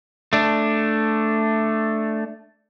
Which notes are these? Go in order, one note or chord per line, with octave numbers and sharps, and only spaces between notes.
A3 D4